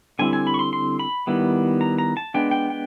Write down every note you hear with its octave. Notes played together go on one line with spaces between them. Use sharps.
D3 G3 C4 E4 G#5
G#5
B5
C#6
C6
C6
B5
D#3 G3 B3 E4
A#5
A#5
A5
G#3 B3 D4 G5
G5
G5